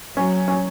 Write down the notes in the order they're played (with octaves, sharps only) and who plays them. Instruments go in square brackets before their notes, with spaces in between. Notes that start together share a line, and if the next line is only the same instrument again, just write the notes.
[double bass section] F#3 [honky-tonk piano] C#4
[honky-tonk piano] C#4